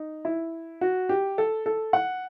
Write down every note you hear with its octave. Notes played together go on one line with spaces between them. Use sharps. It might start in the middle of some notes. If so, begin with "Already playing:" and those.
Already playing: D#4
E4
F#4
G4
A4
A4
F#5